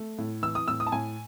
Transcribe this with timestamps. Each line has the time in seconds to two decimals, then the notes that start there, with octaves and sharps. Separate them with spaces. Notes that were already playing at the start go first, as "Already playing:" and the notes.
Already playing: A3
0.18 A2
0.43 E3 E6
0.55 D#6
0.68 A2 E6
0.80 D#6
0.87 A5
0.92 A2 G#5